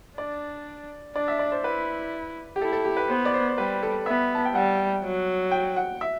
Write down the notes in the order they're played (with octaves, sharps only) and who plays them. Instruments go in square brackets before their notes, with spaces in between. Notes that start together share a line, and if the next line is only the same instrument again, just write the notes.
[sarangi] D4 [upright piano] D5
[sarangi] D4 [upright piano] D5
[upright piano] E5
D5
C5
[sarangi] E4 [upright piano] B4
[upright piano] G4
[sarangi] E4 [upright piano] A4
[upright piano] A4
G4
B4
[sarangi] B3 [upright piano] C5
[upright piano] D5
C5
C5
[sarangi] G3 [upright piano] B4
[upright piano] A4
[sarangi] B3 [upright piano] E5
[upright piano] A5
G5
[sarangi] G3 [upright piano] F#5
[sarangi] F#3
[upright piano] G5
F#5
E5